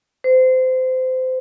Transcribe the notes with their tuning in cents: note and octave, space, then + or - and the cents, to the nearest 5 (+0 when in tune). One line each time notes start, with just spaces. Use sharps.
C5 -25